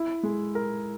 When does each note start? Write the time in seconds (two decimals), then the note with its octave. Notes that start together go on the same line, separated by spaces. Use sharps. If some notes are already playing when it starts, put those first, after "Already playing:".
Already playing: E4
0.23 G#3
0.55 A#4